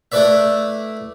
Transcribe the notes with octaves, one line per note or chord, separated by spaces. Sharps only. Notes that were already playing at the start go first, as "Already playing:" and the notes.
A3 D4 E4 B4 D5 E5